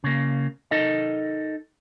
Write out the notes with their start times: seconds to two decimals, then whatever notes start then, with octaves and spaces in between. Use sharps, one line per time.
0.04 C#3 A#3
0.71 D#4 A4 A#4 D#5